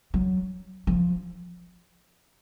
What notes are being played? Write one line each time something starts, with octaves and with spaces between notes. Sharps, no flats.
F#3
F3